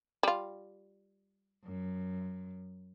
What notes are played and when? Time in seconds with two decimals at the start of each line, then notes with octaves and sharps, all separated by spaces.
0.23 G3 F4
1.63 F#2